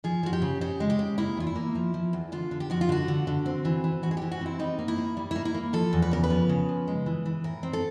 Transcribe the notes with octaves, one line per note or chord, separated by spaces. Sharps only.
F3 G#4
F3 F#4
G4
C#3
C#3 G4
G#3
G4
C#3
A#3 E4
E2 F4
E4
A#3
F3
F3
E2
D3 F4
D3
G4
F3 F#4
F4
D3 F#4
D3
D3
C4
E3
E3
G#2 F#4
G#4
E3 G4
F#4
C4 E4
G3 D#4
A#3
E4
A#3
G3
A#3 E4
E4
A#3
F3 A4
E2
B4
C#3 A#4
B4
F3
C#3
F3
G#3
E3
E3
A2 A#4
C4
A4